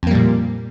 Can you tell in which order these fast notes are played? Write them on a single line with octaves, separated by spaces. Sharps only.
F2 A#3 G3 A#2